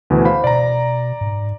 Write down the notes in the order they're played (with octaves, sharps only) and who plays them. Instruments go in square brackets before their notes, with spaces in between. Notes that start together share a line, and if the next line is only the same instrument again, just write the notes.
[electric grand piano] D2 B2 E3
C5 F5 B5
[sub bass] B2 [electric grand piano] D5 A#5
[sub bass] G#2